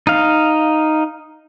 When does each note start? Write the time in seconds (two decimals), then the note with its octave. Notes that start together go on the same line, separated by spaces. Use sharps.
0.07 D#4 F5